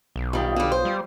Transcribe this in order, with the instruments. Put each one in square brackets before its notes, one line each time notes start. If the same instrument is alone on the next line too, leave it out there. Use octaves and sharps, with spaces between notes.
[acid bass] B1
[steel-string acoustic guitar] D#3 G3 [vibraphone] F4 F5 D#6
[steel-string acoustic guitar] D3 G3
C5
[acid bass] G3